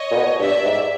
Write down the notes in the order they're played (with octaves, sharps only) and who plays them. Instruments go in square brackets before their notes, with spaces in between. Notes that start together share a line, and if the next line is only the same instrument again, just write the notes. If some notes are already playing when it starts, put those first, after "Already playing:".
Already playing: [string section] C#5 D#5
[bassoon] A#2
B2
[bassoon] G2 [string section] D5 E5
[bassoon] G#2